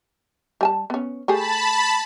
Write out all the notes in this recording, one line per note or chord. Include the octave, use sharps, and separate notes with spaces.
G3 G#5 A5
B3 C#4
A3 G4 G#4 A5 B5